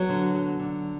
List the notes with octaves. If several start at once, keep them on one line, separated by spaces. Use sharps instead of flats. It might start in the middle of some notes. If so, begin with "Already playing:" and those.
Already playing: F#3 B3
D3
F#3
D3